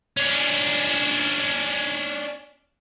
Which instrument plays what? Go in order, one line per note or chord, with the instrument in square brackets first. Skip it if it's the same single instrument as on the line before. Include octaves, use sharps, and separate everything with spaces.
[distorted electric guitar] C#4 D4